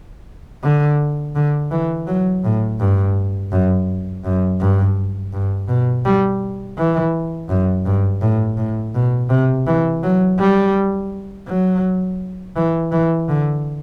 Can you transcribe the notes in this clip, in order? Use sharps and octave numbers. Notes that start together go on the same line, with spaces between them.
D3
D3
E3
F#3
A2
G2
F#2
F#2
G2
G2
B2
G3
E3
F#2
G2
A2
A2
B2
C3
E3
F#3
G3
F#3
E3
E3
D3